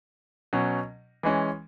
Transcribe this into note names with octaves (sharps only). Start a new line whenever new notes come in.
B2 F#3 C#4
E3 G#3 C#4